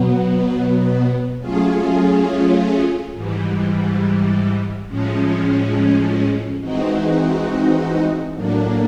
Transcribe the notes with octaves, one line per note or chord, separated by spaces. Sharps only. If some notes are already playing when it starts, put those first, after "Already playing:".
Already playing: B2 F#3 B3
F#3 A3 C#4 F4 G#4
G#2 E3 G3
A2 F3 G#3 C#4
E3 G#3 C4 D#4 F#4
A2 F#3 A#3 D4